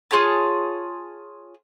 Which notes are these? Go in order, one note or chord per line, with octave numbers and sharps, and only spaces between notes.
F4 G#4 C#5 A5